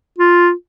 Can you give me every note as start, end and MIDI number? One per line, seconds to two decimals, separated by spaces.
0.19 0.51 65